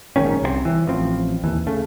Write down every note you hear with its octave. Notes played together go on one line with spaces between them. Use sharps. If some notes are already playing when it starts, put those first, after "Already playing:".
A#1 G#2 D#3 C#4
C2 E3 C4
E3
A1 F3 C4
D#2 E3
C#3 A3